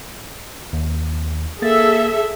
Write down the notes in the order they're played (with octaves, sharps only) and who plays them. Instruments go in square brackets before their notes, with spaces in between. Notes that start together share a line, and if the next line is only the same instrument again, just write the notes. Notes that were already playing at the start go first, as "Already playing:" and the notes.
[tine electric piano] D#2
[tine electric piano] A#3 A6 [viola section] G#4 A4 E5